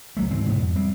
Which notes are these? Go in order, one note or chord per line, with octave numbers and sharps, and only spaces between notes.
C#2 F#3 A3
G#2 E3 C4
G#2 B2 B3
F2
G3 C4